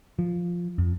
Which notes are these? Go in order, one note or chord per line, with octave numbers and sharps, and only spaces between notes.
F3
F2